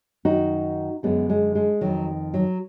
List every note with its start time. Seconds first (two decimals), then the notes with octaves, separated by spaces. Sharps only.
0.25 F#2 D#3 D#4 F#4
1.03 F#2 D3 G#3 B3
1.30 G#3
1.55 G#3
1.81 F2 D#3 F#3
2.34 F#3